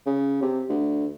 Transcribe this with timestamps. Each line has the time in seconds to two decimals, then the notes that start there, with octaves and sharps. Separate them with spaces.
0.06 C#3
0.42 C3
0.69 D2